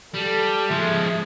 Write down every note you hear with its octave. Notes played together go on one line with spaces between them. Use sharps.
G3 A4
F3 G#3 E5